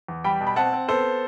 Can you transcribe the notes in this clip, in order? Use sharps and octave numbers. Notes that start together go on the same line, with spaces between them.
E2
G3 G5 B5
B2
B5
C4 F#5 A5
C4
B3 A4 C5